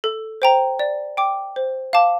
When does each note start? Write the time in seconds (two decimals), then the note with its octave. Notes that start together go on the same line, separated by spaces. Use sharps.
0.04 A4
0.42 C5 G5 A#5
0.79 D5
1.17 G5 D6
1.56 C5
1.93 F5 A5 D6